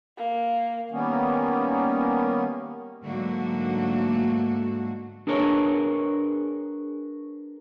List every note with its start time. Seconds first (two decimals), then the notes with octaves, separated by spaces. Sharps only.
0.18 A#3
0.91 D#3 G3 A#3 B3 C#4
3.05 G#2 D3 F#3 A3 A#3 F#4
5.27 D4 G#4 A#4 B4 C#5